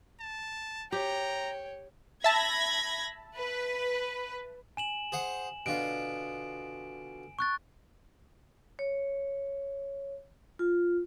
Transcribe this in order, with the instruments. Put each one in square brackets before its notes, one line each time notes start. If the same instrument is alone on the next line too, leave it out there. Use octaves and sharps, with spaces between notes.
[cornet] A5
[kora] G4 [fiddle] C#5 [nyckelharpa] G5 [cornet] A#5
[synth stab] E5 A5 [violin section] B5 G#6 A#6
[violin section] B4
[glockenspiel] G#5 E7 F#7
[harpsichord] G#4 C5 F#5
[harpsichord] B2 D3 F4 [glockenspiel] D7
[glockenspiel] C#6 F#6 A6
[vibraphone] C#5
F4